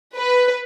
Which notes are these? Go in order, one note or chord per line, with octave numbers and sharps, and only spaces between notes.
B4